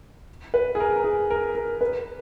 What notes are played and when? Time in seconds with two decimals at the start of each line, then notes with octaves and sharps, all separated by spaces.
0.54 B4
0.75 G#4
0.80 A#4
0.96 A#4
1.04 G#4
1.30 A#4
1.55 A#4
1.81 B4